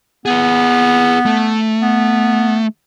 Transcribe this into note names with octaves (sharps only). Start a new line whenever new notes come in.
B3 G#4 B4
A3
B3